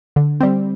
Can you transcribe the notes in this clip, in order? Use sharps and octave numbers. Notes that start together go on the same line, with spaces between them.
D3
G3 C4